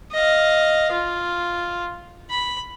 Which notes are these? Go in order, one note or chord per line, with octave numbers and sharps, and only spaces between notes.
D#5 F5
F4
B5